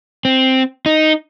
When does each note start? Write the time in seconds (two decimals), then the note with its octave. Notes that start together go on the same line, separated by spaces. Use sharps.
0.25 C4
0.86 D#4